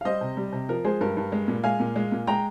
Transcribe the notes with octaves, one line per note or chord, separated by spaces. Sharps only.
F5
G3 C5 D#5
C3
G3
C3
F3 A#4
G#3 G#4 C5
G2 A#4
G2
G#3
A#2
G#3 F5 G#5
A#2
G#3
A#2
G#3 G5 A#5